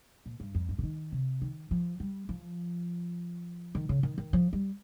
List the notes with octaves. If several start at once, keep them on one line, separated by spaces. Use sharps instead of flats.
A#2
G2
F2
G2
C#3
D#3
C3
D#3
F3
G3
F3
D#3
C#3
D#3
D#3
F3
G3